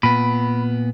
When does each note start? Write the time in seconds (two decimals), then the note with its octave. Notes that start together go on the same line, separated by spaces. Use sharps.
0.03 A#2 B3 B5